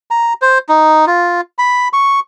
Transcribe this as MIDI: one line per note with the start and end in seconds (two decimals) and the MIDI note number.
0.11 0.33 82
0.42 0.58 72
0.69 1.05 63
1.07 1.41 65
1.58 1.88 83
1.93 2.20 85